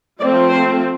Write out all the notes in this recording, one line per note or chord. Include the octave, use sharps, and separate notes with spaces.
F3 A3 C4 D5
C5